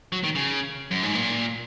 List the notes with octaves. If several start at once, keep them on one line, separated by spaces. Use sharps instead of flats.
F#3
D#3
C#3
F#2
G#2
A#2